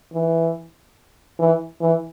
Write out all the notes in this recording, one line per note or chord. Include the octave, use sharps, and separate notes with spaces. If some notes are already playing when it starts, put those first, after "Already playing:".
E3
E3
E3